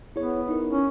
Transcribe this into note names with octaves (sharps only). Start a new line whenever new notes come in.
B3 E4 G#4 C#5
D#4 E4 A#4
C#4